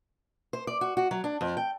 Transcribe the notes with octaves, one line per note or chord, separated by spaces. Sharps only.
C5
D5
F#4
F#4
F#3
D4
F2
G5